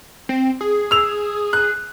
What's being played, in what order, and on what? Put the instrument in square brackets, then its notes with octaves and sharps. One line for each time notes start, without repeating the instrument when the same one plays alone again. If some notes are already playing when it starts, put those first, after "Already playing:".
[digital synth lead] C4
G#4
[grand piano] E6 F7
F#6